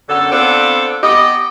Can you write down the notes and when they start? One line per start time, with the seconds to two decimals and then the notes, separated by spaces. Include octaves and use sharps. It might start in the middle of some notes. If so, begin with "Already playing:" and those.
0.08 F#2 D3 B3 A4
0.31 B3 C4 D4 F4 A4
1.03 B3 G4 D#5